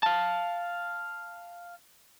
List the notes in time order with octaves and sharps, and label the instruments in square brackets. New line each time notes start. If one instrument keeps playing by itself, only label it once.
[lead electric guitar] F5 A5